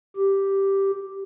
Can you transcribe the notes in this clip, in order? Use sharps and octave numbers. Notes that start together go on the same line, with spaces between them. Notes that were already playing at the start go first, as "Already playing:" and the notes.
G4